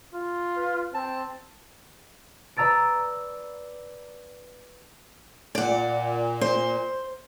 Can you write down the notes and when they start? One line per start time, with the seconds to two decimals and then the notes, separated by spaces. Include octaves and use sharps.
0.14 F4
0.56 B4
0.94 C4 A5
2.57 B4 D5 A#5 E6 A6 D7
5.55 A#2 D5 F#5
6.41 C5